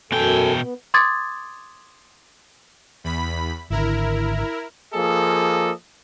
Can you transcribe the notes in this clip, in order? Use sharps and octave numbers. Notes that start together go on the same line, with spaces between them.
F#2 B2 A4 G5 G#5
B3
C6 D6 D#6 G#6 A6
E2 B5 B6
G#1 D3 E4 A#4
F3 A#3 G#4 A4 D#5